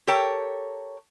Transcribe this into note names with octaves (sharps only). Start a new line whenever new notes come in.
G4 A4 A#4 C#5 G5 A5